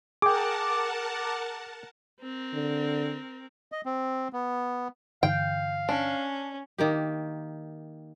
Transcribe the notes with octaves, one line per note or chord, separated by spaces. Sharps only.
G#4 A#4 F#5 G5 A5 D6
C4 A#4
D3
D#5
C4
B3
G2 D3 E3 F5 G5
C#4 D4
D#3 A#3 G4